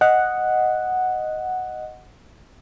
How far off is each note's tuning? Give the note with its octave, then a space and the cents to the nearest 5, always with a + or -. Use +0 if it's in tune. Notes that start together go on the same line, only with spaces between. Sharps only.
D#5 +0 F#5 +0